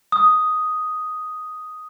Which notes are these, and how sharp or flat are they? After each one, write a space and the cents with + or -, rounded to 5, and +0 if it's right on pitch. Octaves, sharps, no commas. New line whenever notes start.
D#6 +5